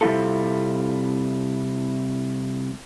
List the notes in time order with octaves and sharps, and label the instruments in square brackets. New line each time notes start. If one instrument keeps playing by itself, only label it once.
[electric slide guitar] C3 G3 C4 E4 F4 A4